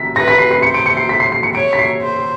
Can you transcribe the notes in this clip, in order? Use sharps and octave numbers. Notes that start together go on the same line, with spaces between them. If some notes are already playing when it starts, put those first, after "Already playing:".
Already playing: B6
B4 A#6
B6
C7
C7
C5 C#7
D7
C#7
C7
B6
C7
C7
C#7
C#5 D7
B6
C7
C5